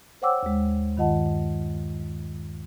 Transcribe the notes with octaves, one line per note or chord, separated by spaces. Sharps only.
C5 C#5 F#5 G5 D6 E6
D#2 G#3
G2 D#3 F4 D#5 F#5 A5